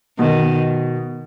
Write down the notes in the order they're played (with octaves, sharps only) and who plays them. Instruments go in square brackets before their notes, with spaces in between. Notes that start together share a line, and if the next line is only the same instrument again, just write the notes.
[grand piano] B2 [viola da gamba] D#3